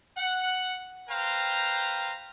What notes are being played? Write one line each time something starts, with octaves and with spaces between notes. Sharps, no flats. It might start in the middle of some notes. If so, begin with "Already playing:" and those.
F#5
B4 C5 F5 G5 A#5